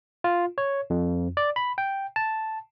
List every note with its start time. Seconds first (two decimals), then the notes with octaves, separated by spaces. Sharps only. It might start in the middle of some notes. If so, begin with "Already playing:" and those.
0.24 F4
0.58 C#5
0.90 F2
1.37 D5
1.56 B5
1.78 G5
2.16 A5